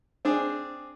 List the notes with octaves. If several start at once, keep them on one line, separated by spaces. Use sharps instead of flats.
C4 D4 G#4